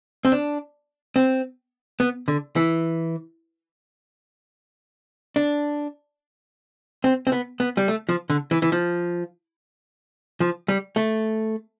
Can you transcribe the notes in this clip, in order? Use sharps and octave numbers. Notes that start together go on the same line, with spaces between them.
C4
D4
C4
B3
D3
E3
D4
C4
C4
B3
B3
G3
A3
F3
D3
E3
E3
F3
F3
G3
A3